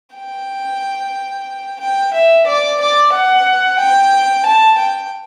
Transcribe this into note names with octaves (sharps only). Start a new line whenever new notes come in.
G5
G5
E5
D5
D5
F#5
G5
A5
G5